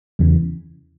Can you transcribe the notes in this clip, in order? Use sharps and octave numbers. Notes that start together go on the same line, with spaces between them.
E2 C#3 E3